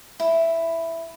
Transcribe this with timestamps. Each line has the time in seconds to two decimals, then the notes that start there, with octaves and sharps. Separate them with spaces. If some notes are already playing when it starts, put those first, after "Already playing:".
0.20 E4